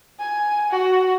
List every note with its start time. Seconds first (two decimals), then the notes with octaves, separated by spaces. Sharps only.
0.20 G#5
0.71 F#4